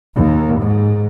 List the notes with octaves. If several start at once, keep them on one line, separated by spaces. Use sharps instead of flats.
D#2
G#2